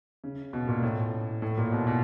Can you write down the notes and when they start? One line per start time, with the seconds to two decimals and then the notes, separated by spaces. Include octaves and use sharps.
0.24 C#3
0.53 B2
0.68 A#2
0.83 A2
1.42 A2
1.57 A#2
1.72 B2
1.87 B2